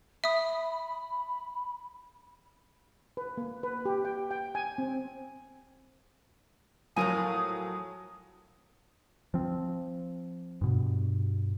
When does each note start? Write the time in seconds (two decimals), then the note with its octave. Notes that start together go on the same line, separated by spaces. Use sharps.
0.24 E5 B5 D#6
3.17 B4
3.37 A#3
3.63 B4
3.85 G4
4.05 G5
4.31 G5
4.55 G#5
4.78 C4
6.96 A2 F3 F#3 A#4 G#5 D#6
9.34 F3 C4
10.61 G2 B2